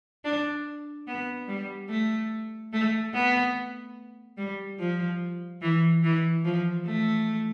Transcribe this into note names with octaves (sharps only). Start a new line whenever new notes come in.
D4
B3
G3
A3
A3
B3
G3
F3
E3
E3
F3
A3